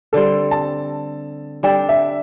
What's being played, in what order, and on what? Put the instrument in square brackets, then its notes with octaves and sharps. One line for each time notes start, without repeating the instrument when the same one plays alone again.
[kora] D3 G3 C4 [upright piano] A4
[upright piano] A5
[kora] G3 D4 A4 D5 [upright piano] G5
[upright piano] E5